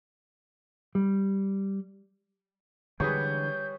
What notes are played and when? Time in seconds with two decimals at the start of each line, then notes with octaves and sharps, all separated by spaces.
0.95 G3
3.00 D3 E3 G3 G#3 G#4 B4 C#5 G6